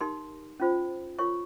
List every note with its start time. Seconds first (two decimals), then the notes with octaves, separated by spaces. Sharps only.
0.01 D#4 G4 A#4 C6
0.60 C#4 F4 C5
1.19 F4 A#4 C#5 C#6